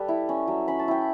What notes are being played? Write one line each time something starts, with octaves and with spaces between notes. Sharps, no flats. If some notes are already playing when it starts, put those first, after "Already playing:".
Already playing: G3 A4 B4 A5
E4
C#4
F#3
C#4 B5
A5
E4 G5